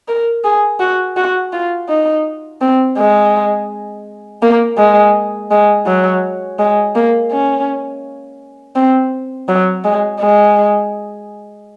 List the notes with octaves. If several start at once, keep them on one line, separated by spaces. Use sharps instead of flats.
A#4
G#4
F#4
F#4
F4
D#4
C4
G#3
A#3
G#3
G#3
F#3
G#3
A#3
C#4
C4
F#3
G#3
G#3